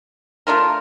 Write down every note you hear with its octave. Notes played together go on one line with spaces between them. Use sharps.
A3 D4 F4 A#4